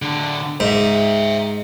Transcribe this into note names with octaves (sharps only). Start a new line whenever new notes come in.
A2 D3
G#2 C5 E5